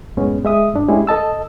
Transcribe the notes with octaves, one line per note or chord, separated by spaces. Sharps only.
F#2 A2 G#3 B3 C#4
G#3 E5 D#6
G2 D4
G#3 A3 C#4 E4 G4 G#4
A4 D#5 A5 E6